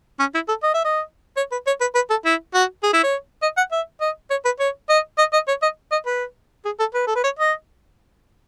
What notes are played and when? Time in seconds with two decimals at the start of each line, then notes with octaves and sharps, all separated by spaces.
0.19 C#4
0.34 E4
0.48 A4
0.63 D#5
0.74 E5
0.85 D#5
1.37 C#5
1.52 B4
1.67 C#5
1.81 B4
1.95 B4
2.10 A4
2.25 E4
2.54 F#4
2.83 G#4
2.93 E4
3.03 C#5
3.42 D#5
3.57 F#5
3.72 E5
4.01 D#5
4.30 C#5
4.45 B4
4.60 C#5
4.89 D#5
5.18 D#5
5.33 D#5
5.48 C#5
5.62 D#5
5.92 D#5
6.06 B4
6.65 G#4
6.80 A4
6.94 B4
7.07 A4
7.15 B4
7.24 C#5
7.39 D#5